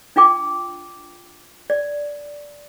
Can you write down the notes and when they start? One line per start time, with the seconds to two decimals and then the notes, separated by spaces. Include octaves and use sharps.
0.16 D4 F4 G5 D6
1.70 D5